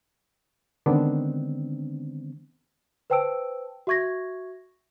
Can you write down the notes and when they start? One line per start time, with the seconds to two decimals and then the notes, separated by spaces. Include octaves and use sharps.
0.86 D3 D#3 G#3 B3 C4 D4
3.10 B4 C5 G5 A5 E6 D7
3.87 F#4 E5 C#6 G#6 A#6